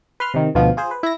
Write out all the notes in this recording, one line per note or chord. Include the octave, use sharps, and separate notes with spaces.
B4 C6 F6
C3 D#3
D2 B2 F3 F4
F4 G#4 C5
B4
E4 A#6